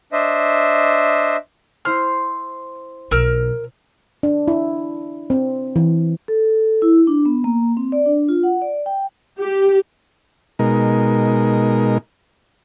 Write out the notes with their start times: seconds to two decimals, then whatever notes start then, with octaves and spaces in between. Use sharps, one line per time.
0.12 D4 C5 D#5 E5
1.85 E4 C5 C6 F6
3.11 B1 A#4 E6 F6
4.23 D4
4.48 E4
5.30 C4
5.76 E3
6.28 A4
6.82 E4
7.07 D4
7.26 B3
7.44 A#3
7.77 C4
7.92 D5
8.06 D4
8.29 F4
8.43 F#5
8.62 D5
8.86 G5
9.38 G4
10.59 B2 G#3 D#4 A#4